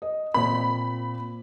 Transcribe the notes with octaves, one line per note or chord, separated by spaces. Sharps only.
D#5
A#2 C4 B5